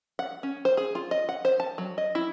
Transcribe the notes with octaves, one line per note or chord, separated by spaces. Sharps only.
F#5
C#4
C5
G#4
F4
D#5
F#5
C5
A5
F#3
D#5
E4